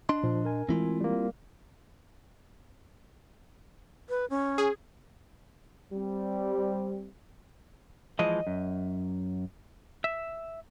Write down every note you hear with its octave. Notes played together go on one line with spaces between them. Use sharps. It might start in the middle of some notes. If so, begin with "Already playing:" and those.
D4 D#5 C6
A#2 F3
A#4 G#5
E3 G#3 A3 C4 E4 F4
G3 A#3
B4
C#4
G#4
G3 C4
E3 F3 G#3 D#5
F#2
E5